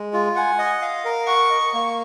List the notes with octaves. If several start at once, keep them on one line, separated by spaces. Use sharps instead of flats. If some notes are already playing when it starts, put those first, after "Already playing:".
Already playing: G#3
F4
F#5 G#5
D#5
F5
A#4
F#5 C#6
D#5
A#3